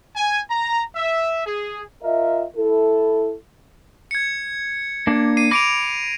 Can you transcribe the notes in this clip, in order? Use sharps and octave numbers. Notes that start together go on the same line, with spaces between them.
G#5
A#5
E5
G#4
F4 A#4 D#5 E5
E4 A4
G#6 C#7
A#3 D4
C7 D#7
B5 D6 A#6 D7 F7